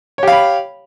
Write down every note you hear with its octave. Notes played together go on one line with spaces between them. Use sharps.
G4 C#5 F5 B5